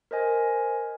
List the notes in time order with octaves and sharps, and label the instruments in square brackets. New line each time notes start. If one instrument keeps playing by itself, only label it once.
[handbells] A#4 C5 D#5 G#5